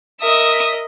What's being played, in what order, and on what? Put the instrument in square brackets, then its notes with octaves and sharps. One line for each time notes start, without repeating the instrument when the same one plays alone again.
[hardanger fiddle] A#4 D#5 [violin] E5 D#6